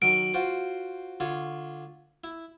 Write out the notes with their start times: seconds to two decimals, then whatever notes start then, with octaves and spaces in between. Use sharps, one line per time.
0.02 D#3 F#3 A#4 D7
0.34 F4 F#4 C5
1.20 D3 F4 C#5
2.24 E4